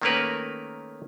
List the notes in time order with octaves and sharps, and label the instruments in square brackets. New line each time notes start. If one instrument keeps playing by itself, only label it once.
[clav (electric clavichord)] D#3 A3 A#3 C#4 A#4 B4